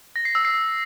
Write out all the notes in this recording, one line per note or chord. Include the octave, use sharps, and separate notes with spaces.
A#6
C7
E6
C7